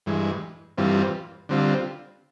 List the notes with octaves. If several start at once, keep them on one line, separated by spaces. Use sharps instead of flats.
G2 E3 G#3
G2 E3 G3 C4 F4
D3 G3 C4 F4